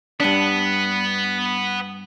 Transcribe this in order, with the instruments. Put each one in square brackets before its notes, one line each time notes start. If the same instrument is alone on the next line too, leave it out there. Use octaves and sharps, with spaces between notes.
[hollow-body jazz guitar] G2 D4 [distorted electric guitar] B3